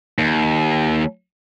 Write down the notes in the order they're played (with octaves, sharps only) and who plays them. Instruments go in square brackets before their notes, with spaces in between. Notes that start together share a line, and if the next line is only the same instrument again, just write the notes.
[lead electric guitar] D#2